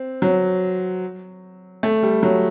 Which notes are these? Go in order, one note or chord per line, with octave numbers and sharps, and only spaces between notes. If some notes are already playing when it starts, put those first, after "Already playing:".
Already playing: C4
F#3
A3
G3
F#3